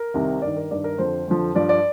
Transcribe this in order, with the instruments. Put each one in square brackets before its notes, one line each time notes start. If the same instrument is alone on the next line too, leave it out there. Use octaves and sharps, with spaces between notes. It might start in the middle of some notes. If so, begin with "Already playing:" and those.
Already playing: [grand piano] A#4
C2 C3 D#3
G2 D#3 D5
A#4
G2 D#3 D5
A#4
F2 D3 F3 C5
F2 D3 F3
G2 F3 D5
D5